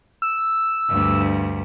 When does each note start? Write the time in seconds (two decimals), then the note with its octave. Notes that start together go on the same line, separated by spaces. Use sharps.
0.22 E6
0.89 D2 G2